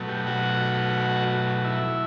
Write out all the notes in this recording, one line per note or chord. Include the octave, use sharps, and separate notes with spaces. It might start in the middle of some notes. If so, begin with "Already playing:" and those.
Already playing: B2 F#3 A3
G4
F#4
E4